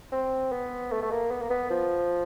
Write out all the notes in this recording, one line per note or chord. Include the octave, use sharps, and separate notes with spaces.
C4
B3
A3
A3
A#3
B3
A#3
B3
F3